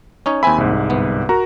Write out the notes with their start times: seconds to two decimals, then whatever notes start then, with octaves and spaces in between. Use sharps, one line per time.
0.26 C#4 D#4 C#5
0.43 D#2 C4 E5 G#5 B5
0.58 C2 G#2
0.90 G1 B3
1.29 F#4 A#4 A#5